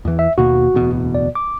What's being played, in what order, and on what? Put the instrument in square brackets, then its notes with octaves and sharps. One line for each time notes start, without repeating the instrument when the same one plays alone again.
[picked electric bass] E2 E3
[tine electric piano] E5
[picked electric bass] D#2 B2 A#3 [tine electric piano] F#4
[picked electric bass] D1 E2 B2
[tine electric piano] D5
D6